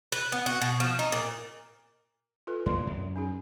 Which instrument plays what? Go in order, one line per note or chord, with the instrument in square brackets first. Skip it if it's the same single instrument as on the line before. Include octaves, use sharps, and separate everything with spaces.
[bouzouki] B4
B3
F#4
B2
F3
D#4
A#2
[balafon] F4 A4 B4
[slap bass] F2 A#3 [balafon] D5 C6
[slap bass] F#2
[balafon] C#4 D#4 G#4